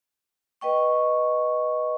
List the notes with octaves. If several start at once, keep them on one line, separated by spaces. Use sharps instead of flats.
B4 D#5 G5 C#6